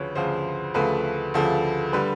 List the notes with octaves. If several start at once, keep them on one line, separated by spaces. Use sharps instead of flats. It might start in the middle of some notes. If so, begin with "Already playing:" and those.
Already playing: D2 C#3 F3 B4 C#5
D2 C#3 F3 C5
D2 C#3 F3 A3 B4
D2 C#3 F3 A3
D3 G3 B4